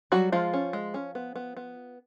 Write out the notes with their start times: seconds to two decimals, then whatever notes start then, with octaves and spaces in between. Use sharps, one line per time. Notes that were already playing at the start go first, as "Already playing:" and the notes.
0.12 F#3 G3 F#4
0.32 F3 G#3 F4
0.53 C#4
0.73 G#3
0.94 C#4
1.15 B3
1.36 B3
1.57 B3